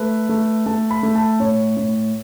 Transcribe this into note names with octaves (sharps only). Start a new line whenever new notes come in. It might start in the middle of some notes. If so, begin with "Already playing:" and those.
Already playing: A3 B4
A3
A3 A5
B5
A3
A5
A2 C#5
A2